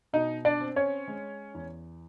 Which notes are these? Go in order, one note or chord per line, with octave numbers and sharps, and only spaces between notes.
B2 D#4 D#5
D4 D5
C4
C#4 C#5
G#3
E2